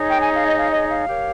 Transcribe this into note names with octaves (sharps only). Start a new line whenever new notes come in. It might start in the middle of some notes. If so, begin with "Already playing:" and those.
Already playing: D#4 G#4 C#5
G5
G#5
F5
D#5
F5
D#5
F5
G4 A#4 C#5